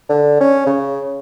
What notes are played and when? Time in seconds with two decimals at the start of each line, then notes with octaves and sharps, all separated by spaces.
0.09 D3
0.41 C#4
0.66 C#3